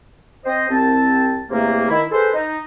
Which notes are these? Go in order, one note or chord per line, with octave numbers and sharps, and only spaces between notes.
C4 C5 D#5
C2 C4 A5
E2 C3 A3 A#3
D#3 E4
G#4 A4 B4 C5
D#4